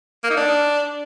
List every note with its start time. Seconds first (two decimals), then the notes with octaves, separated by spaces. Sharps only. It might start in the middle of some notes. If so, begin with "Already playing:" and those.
0.24 A#3
0.30 D#4
0.37 D4